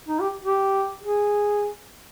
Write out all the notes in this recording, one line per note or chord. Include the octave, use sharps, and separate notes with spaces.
D#4
G4
G4
G#4